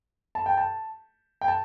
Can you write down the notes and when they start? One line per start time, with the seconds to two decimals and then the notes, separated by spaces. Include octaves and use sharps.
0.35 A5
0.46 G5
0.57 A5
1.41 G5
1.48 A5